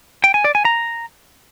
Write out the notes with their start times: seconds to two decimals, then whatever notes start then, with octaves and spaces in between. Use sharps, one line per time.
0.24 G5
0.34 G#5
0.44 D5
0.55 G#5
0.65 A#5